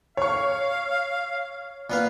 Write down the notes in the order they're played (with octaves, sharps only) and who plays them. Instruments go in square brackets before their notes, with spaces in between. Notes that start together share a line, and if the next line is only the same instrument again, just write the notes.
[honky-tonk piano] C#5 C#6 [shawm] F5
[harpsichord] A#2 B3 F5 [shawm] B4